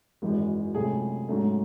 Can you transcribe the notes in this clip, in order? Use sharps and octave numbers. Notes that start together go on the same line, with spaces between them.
G#1 F#2 E3 G#3
C#2 C3 F#3 A3 G#4
G#2 F#3 A3 C#4